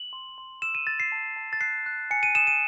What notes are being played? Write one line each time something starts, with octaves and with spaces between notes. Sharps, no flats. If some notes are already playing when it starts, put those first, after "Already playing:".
Already playing: F#7
C6
C6
E6 E7
D#7
E6 A6
C7
A5
A5
A6
F#6 C7
F#6
G#5 C#7
D#7
D#6 E7
D#7